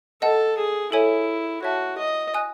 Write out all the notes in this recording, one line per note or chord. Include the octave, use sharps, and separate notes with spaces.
A4 D#5 F#5 A5
G#4
E4 A4 C#5 E5 G#5
F#4 C#5 E5 A5
D#5
D#5 G#5 D#6 F#6